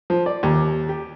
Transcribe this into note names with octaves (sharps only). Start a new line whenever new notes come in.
F3
D5
D#2
G4